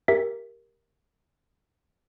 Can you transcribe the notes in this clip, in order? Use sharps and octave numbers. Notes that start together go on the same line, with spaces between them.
G4 A#4 E5 B6